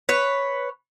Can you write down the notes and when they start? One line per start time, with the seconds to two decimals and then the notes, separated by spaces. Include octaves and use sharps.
0.09 B4 C#5